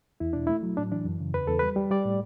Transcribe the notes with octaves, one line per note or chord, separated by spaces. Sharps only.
E2 E4
B2 D4
A3 E4
F#3
A2 D4
E3 D4
F#2
C#3
E2 B4
E2 A4
G3 B4
G3
G3 D5
A2